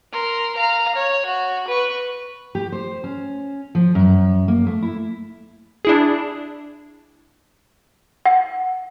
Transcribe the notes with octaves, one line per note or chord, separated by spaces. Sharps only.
A#4 C6
F5 A#5
C#5
F#4
B4 C#6
G4
C5
C#4
F3
F#2
A#3
A3
E4
D4 E4 G#4
F#5